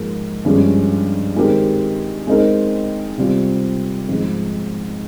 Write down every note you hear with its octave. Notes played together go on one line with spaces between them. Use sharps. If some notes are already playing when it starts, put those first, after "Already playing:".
Already playing: G#2 F3 A#3
G2 F3 G#3 C#4
D#3 G#3 C4 G4 A#4
G#3 C4 D#4 A#4
C3 G3 C4 F4
G#2 F3 C4 D#4